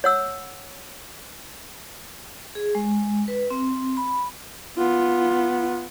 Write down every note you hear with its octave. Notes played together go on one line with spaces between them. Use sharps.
C#5 F#5 E6
G#4
G#3
B4
C4
B5
B3 F4